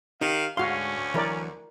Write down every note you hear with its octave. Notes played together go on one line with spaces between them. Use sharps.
D#3 D#4 G4 F5
D2 G#2 C#4 F#4 F5 C6
E3 F#3 E4 A#4 D5